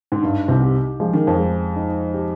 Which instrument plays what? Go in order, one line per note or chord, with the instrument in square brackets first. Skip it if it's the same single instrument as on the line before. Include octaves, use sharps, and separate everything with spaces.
[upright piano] G#2
[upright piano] G2 [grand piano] D#4
[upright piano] C2 C3
[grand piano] G4
[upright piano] F3 [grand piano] G#3
[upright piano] D#3
F2 F3
[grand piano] G#3
D#4
G4